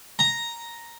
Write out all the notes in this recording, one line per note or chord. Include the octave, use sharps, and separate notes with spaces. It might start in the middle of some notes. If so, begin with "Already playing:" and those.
A#5